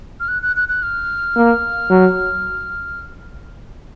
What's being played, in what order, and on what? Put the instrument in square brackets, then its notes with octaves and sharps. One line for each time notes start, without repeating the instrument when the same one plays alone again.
[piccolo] F6
F#6
F#6
F#6
F#6
F6
[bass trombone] A#3
F#3